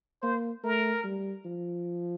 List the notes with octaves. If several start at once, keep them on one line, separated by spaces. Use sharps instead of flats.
A#3 C5
A3 A#4
G3
F3